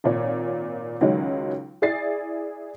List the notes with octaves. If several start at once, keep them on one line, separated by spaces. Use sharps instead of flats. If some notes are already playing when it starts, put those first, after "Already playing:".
G#1 A#2 C#5
C#2 D#3 F#3 G#3 C#4
E4 G#4 D5 A6 C7